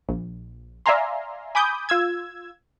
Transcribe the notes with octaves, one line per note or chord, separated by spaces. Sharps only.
A#1
D5 E5 F5 G#5 A#5 C6
G#5 B5 D6 D#6 G6
F4 E6 G#6